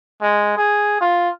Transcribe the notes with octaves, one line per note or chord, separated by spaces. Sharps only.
G#3
G#4
F4